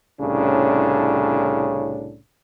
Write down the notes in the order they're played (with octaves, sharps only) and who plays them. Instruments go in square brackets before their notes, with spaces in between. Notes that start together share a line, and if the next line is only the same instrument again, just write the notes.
[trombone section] C2 A2 C#3 C#4 D4